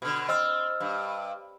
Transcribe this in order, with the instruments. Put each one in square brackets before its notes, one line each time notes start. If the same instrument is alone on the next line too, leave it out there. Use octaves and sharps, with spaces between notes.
[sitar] B2 D3
[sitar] C4 [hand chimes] D#5 E6 F6
[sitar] G2